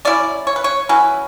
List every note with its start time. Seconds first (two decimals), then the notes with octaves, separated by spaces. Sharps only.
0.05 F#3 C#4 E4 D5
0.47 C#5
0.56 B4
0.64 C#5
0.89 F#3 C#4 E4 B4